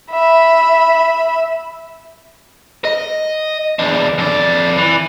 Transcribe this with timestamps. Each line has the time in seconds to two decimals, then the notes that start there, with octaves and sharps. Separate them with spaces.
0.11 E5 B5
2.85 D#5
3.79 E2 D4
4.18 F2 D5
4.77 E3